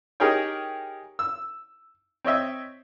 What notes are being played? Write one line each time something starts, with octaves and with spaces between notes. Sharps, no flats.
D#4 G4 G#4 A#4 C#5 G5
E6
C4 C#5 D#5 E5